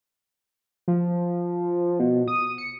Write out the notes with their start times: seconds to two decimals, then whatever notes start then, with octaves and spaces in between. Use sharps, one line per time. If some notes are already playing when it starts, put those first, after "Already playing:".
0.88 F3
2.00 B2
2.28 D#6
2.58 C#7